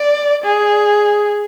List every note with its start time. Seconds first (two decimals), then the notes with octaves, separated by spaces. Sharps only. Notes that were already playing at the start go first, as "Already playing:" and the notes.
Already playing: D5
0.44 G#4